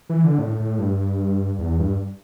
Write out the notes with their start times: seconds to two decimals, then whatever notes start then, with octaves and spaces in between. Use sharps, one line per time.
0.09 E3
0.24 D3
0.38 A2
0.60 A2
0.79 G2
1.59 E2
1.79 G2